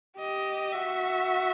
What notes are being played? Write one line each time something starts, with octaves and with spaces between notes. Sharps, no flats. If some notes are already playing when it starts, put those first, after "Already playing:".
G4 D#5
F#4 E5